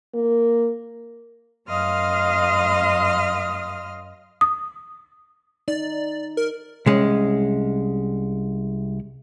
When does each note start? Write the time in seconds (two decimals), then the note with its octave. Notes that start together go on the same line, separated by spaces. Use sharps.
0.15 A#3
1.69 F#2 D#5 F5 C6 D#6 F6
4.41 D#6
5.68 D#4 D5
6.37 A#4
6.86 C2 G#3 C#4